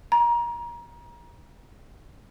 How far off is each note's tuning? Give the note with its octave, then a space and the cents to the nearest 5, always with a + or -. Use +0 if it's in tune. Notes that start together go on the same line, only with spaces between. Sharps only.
A#5 +25